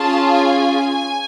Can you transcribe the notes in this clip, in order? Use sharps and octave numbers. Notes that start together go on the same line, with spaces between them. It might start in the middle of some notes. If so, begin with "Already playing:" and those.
Already playing: C#4 F4 G#4 A5
G#5